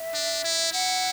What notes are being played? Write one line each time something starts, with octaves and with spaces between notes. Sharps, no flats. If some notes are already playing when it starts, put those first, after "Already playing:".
Already playing: E5
D4
E4
E4 F#5